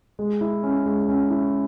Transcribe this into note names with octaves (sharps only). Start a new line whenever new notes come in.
G#3
E4
C#4
G#3
C#4
E4